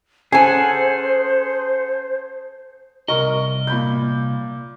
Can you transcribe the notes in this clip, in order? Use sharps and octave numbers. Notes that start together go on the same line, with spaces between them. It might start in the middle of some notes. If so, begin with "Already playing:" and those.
C#4 G#4 A4 C5 F#5 G#5
C2 A#4 D#5 C#6
A#2 B5 G6